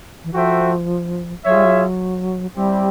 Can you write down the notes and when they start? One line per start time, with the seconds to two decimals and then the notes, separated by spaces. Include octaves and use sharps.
0.24 E3
0.33 F3 F#4 A4 C5 E5 G5
1.45 F#3 F4 G#4 C#5 E5
1.55 G3
1.65 F#3
2.56 G3 C4 E4 G4